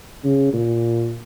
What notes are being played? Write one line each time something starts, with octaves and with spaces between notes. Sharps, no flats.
C#3
A#2